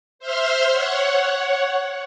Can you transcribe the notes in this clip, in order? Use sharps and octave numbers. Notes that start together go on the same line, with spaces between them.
C5 E5 C6 F6
C#5 F#5